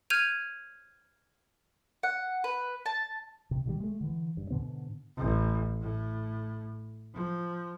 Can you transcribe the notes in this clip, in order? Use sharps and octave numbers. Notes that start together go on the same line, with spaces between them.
F6 G6 G#6 D#7 F7
F#5
B4
A5
C3
B2 D#3 G3
G#3 A3
D3 E3
G2
G#2 B2 D3 B3
A1
A2
F3